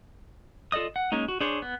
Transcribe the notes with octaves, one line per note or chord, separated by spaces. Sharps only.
F4 A4 D5 D#5 D#6
F#5
G#3 A#3 C#4 D#4
F#4
D4 G#4 C5 C#5
B3